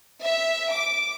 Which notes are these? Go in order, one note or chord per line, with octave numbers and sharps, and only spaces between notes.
E5
D6